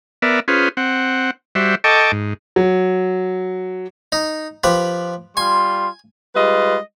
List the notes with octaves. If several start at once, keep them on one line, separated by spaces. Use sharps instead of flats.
B3 A#4 D5 E5
C#4 F4 G#4 B4 C5
C4 F#5
G3 F#4 C5 E5
A4 D#5 G5 A5 C#6 D6
G#2
F#3
D#4
F3 G4 B4
G3 F4 G#5 C6
G3 G#3 F4 B4 D#5